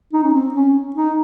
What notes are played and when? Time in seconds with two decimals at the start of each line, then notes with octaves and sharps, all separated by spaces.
0.13 D#4
0.23 C#4
0.33 C4
0.54 C#4
0.96 D#4